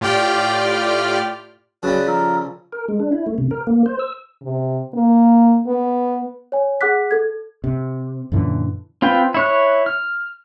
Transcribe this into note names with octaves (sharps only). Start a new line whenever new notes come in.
A2 F4 G4 D5 G5 F6
C#3 F#3 G3 B4 A5
F3 A4 A#4
A#4
G#3
D4
E4
A3
C3
A#4
A#3
C5
E6
C3
A#3
B3
C#5 G#5
G#4 F#5 D6 F#6 B6
A4 G#6
C3
F#2 A#2 D3 E3
C4 F4 B4 G5
E4 C#5 F#6
F6